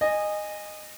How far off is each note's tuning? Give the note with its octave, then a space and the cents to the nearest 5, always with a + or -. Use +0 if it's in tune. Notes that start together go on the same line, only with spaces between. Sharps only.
D#5 -15 G#5 -15